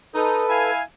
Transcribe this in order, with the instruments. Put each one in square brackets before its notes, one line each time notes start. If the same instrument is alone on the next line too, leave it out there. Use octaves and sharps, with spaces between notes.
[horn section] D#4 D#5 [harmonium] A4 B4
[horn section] E4 F5 G#5